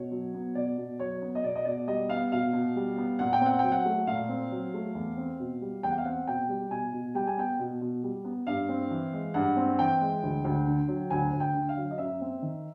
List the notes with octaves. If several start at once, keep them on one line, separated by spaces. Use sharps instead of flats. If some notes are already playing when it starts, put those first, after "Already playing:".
Already playing: B2 C#5
F#3
B3
B2 D5
B2
F#3 C#5
B3
D#5
B2 D5
D#5
B2 D5
G3 D#5
B3 F5
B2 F5
B2
G3
B3
A#2 F#5
G5
C4 F#5
F#3 G5
F#5
A3
A#2 F5
C4
F#3
A3
E2
C4
B2
G3
E2 G5
F#5
F5
C4 F#5
B2 G5
G3
B2 G#5
B2
G3 G5
G#5
B3 G5
B2
B2
G3
B3
G2 F5
C4
E3
G#3
G2 F#5
C4
E3 G5
G#3
D2
D2
D3
F#3
D2 G#5
D2
G5
D3
F5
F#3
D#5
F#2 E5
C4
D#3